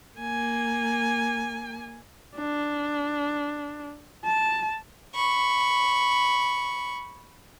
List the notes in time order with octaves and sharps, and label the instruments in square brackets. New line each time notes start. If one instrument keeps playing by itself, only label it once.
[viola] A#3 G#5
[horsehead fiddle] D4
A5
[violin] B5 C#6